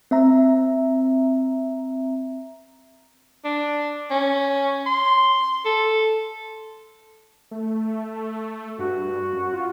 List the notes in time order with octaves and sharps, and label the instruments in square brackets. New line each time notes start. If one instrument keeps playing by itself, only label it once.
[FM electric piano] C4 E5 A#5
[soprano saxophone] D4
C#4
C6
A4
[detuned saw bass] A3
[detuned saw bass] G2 [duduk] F#4
[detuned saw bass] F#2
F4